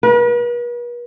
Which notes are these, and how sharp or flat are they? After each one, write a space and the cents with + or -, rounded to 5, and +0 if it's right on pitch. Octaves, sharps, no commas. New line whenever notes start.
B4 -45